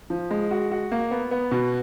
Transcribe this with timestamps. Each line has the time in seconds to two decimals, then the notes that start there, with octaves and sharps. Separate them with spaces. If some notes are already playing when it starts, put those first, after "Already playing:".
0.10 F3
0.31 G#3
0.51 F#4
0.72 F#4
0.92 A#3
1.11 B3
1.31 B3
1.51 B2